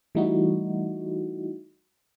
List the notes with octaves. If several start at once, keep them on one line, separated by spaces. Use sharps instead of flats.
E3 G3 A3 D#4 E4 F#4